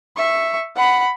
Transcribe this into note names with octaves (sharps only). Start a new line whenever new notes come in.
E5 C#6
F#5 B5